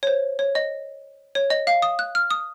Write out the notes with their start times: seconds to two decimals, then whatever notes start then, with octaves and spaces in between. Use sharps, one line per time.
0.03 C#5
0.07 C5
0.39 C#5
0.55 D#5
1.35 C#5
1.50 D#5
1.67 F5
1.82 D#6
1.99 F#6
2.15 F6
2.31 D#6